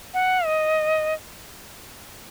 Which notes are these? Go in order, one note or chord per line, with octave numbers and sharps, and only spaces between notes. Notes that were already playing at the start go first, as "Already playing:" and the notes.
F#5
D#5